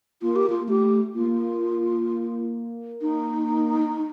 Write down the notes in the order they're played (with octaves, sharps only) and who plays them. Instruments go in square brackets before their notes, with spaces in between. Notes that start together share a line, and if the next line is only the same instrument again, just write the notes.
[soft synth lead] A#3 [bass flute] F4
[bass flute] G4
F4
[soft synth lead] A#3
[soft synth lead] A3 [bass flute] G4
[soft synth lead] A#3 [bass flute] F4
[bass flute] D#4